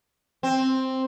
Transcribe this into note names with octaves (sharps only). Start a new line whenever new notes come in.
C4